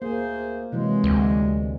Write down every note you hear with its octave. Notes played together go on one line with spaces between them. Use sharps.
D2 A#3 G#4 C5
C3 E3 F#3 G#3
D2